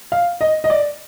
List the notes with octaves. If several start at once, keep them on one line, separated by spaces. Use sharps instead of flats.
F5
D#5
D#5
D5